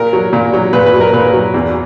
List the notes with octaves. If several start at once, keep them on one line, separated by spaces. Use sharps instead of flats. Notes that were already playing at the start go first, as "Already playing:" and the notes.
Already playing: A#2 A#4
F#3
A#2
F#3
A#2 B4
B4
F#3
A#4
A#2 B4
F#3
E2